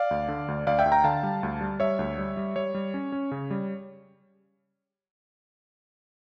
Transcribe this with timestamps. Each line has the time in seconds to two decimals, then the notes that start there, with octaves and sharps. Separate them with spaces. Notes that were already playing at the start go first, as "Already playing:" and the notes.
Already playing: D5 F5
0.11 D2
0.28 D3
0.48 D2
0.67 D2 D5 F5
0.79 E5 G5
0.86 D2
0.92 G5 A#5
1.04 D3 F5 A5
1.23 G3
1.43 D2
1.61 G3
1.80 G3 C#5 E5
1.99 D2
2.18 G3
2.37 G3
2.56 G3 C#5
2.75 G3
2.94 C#4
3.12 C#4
3.31 C#3
3.51 G3